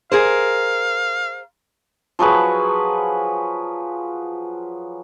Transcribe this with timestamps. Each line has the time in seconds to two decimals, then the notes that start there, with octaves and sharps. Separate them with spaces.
0.12 G#4 A#4 C5 F5
2.19 F3 F#3 G#4 B4